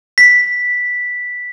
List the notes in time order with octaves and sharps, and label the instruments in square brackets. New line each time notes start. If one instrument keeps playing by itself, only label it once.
[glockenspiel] B6